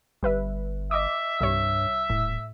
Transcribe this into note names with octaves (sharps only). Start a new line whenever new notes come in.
G1 G3 B4 E5
D#5 E5 D6
C2 G2 G3 C#5 E5
D#1 A2